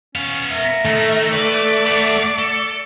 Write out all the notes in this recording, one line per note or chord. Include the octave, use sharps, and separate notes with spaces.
B3 C#4 F5
A#4 E5
D#3 A3
B4 D5 D6
E5 F#5
A4